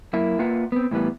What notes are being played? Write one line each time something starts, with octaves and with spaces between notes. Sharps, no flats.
F#2 A#3 E4
A#3 F4 B4 E5 F#5
B3 C4
A2 E3 G3 B3